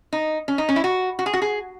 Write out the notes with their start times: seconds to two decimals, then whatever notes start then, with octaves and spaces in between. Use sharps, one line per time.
0.13 D#4
0.48 C#4
0.58 D#4
0.69 C#4
0.76 E4
0.84 F#4
1.19 F#4
1.26 G#4
1.34 F#4
1.42 G#4